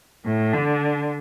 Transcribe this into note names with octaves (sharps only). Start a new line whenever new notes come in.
A2
D3